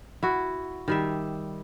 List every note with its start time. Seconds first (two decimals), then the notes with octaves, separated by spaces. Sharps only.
0.23 E4 F#4
0.88 D#3 G3 E5